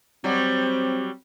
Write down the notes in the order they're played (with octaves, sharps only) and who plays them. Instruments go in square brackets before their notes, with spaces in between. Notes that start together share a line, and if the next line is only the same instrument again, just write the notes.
[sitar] F#3 G3 [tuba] C4